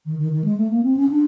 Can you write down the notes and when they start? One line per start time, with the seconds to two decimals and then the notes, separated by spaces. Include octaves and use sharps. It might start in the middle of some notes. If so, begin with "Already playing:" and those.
0.06 D#3
0.19 D#3
0.32 D#3
0.44 G#3
0.57 A3
0.70 A#3
0.83 C4
0.97 C#4
1.09 D4